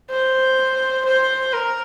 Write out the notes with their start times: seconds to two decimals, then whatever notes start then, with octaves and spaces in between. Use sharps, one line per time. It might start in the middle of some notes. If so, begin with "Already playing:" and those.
0.10 C5
1.05 C5
1.53 A#4